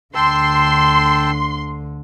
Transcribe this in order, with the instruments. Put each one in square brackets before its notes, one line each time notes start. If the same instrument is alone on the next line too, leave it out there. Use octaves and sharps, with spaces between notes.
[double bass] D2 D3 [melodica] G5 A5 E6 [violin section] C6